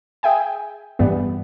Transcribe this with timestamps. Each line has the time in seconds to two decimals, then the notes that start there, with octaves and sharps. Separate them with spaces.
0.23 G#4 E5 G5 G#5
0.99 G2 E3 G3 B3